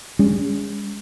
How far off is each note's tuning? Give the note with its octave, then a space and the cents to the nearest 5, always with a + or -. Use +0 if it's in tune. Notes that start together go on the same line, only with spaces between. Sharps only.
G#3 -30 C#4 +25